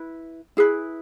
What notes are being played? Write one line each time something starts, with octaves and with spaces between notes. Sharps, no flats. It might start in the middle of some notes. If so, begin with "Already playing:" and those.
Already playing: E4 B4
E4 G#4 B4